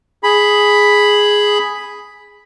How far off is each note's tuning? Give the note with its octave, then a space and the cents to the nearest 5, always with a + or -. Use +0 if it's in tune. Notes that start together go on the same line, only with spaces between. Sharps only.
G#4 +0 B5 +0